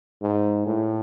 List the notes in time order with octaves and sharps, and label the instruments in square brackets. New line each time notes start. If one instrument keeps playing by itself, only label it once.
[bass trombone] G#2
A2